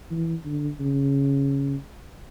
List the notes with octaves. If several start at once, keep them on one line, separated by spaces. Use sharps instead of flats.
E3
D3
C#3